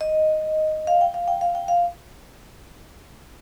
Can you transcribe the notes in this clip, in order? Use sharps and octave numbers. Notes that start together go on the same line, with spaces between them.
D#5
F5
G5
F5
G5
F5
G5
F5